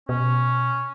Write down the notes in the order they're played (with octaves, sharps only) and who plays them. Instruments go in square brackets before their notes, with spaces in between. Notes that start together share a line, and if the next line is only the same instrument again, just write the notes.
[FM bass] B2 [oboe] C#4